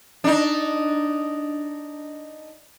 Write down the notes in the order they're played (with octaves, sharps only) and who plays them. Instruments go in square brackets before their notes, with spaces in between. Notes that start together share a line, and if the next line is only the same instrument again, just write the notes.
[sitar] D4 D#4